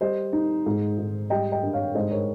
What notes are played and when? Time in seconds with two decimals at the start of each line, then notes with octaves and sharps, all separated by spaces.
0.01 G3 C5 D#5
0.33 D#4
0.66 G#2
0.98 G#2
1.30 G3 D#5 G5
1.52 D#5 G5
1.62 G2
1.73 C#5 F5
1.95 G#2 C5 D#5
2.11 A#4 C#5